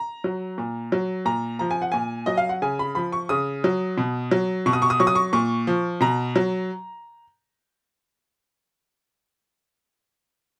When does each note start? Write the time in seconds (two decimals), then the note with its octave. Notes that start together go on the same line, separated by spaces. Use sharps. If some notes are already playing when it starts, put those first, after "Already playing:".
Already playing: A#5
0.24 F#3
0.58 A#2
0.92 F#3
1.26 A#2 A#5
1.59 F3 A#5
1.71 G#5
1.82 F#5
1.92 A#2 G#5
2.26 F#3 D#5
2.37 F5
2.49 F#5
2.62 C#3 G#5
2.79 B5
2.95 F3 B5
3.12 C#6
3.29 C#3 D#6
3.64 F#3
3.98 B2
4.31 F#3
4.66 B2 C#6
4.73 D#6
4.82 C#6
4.90 D#6
5.00 F#3 C#6
5.07 D#6
5.15 C#6
5.33 A#2 C#6
5.67 F3
6.01 B2 A#5
6.36 F#3